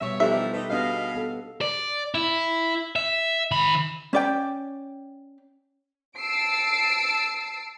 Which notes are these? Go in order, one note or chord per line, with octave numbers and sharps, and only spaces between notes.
G2 B2 G3 B3 C#5 E5
E3 F3 D4 D#4 G4 A4 E5
A3 D#4 B4
B2 B3 D4 G#4 D#5 F5
B3 A4
D5
E4
E5
D#3 B5
C#4 D5 G5
A5 E6 C7 D7